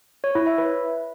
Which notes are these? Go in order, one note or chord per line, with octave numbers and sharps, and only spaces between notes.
C#5
E4
E5
B4